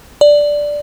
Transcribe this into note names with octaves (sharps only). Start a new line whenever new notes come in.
D5